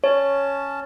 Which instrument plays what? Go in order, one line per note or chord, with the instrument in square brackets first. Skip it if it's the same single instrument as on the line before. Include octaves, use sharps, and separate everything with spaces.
[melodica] C#4 A5 [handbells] C#5